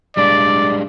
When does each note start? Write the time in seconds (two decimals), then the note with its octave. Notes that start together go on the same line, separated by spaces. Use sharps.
0.17 G3 G#3 D4 D5